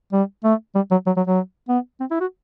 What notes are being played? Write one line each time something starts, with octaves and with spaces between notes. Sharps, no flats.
G3
A3
G3
F#3
F#3
F#3
F#3
B3
C4
E4
F#4